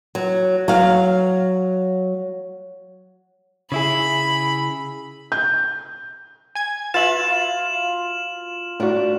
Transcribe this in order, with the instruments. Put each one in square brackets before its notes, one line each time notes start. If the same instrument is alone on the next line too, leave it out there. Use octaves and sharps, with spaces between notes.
[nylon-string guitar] F#3
F#3 F5
[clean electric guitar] C#3 E4 G#4 [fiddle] B5
[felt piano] G6
[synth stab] G#5 G#6
[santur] F4 [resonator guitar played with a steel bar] F#4 B4 [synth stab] E5 A6 [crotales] E7 F#7
[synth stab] A2 F#4 [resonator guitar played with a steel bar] G3 A#3 D4